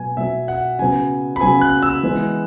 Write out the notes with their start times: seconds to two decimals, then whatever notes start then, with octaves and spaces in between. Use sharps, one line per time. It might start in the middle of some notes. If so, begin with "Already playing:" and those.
Already playing: B2 F#3 B3 G#5
0.17 B2 F#3 B3 E5
0.48 F#5
0.79 C#3 F#3 B3 G#5
1.36 B5
1.41 C#3 F#3 B3 G#5
1.61 F#6
1.83 E6
2.03 E3 G#3 B3